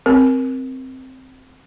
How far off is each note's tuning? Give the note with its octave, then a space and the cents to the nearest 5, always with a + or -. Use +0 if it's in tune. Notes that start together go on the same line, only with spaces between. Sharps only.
C4 +0 A#4 +15